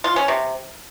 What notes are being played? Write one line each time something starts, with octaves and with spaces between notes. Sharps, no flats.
F4
C#4
C3